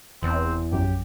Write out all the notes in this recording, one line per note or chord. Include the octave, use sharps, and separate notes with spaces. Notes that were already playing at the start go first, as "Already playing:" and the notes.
F1 E2 C4
A#1 F#2 G4